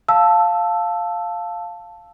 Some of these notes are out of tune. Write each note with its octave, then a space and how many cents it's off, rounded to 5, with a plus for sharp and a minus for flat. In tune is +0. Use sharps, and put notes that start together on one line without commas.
F5 +0 A5 +0 E6 +0